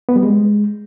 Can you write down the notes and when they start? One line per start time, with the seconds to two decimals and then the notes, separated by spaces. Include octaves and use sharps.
0.09 B3
0.16 G3
0.23 G#3